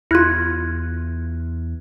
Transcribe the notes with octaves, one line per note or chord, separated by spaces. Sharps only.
E2 E4 F4 F6 F#6 G#6